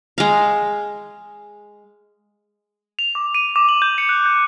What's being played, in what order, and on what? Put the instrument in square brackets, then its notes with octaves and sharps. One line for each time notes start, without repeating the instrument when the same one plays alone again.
[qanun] G#3 F5
[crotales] F7
D6
D#7
D6
F#7
G6
C#7
F#6
G6